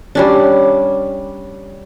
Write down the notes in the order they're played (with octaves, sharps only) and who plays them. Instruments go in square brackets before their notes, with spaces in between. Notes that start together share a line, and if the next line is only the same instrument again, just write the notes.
[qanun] G3 C#4 D4